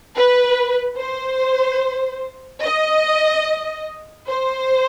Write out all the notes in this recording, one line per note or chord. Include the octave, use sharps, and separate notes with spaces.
B4
C5
D#5
C5